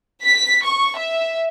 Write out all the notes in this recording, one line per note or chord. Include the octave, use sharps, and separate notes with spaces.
B6
C#6
E5